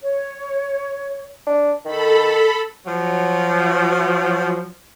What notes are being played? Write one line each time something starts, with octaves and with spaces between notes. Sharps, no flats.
C#5
D4
D#3 A4 B5
F3 F#3